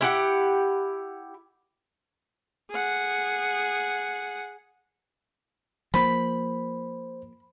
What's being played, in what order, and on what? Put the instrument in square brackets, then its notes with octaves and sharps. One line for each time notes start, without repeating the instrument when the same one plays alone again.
[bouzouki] E4 G4 F#5
[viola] G#4 F#5
[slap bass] F3 A#3 [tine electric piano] C5 [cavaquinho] B5